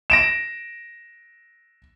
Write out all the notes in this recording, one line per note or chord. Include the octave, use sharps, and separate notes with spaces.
A#6 D7 E7